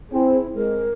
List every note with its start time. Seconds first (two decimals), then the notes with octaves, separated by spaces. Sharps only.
0.12 C4 E4 G#4
0.55 G#3 A#4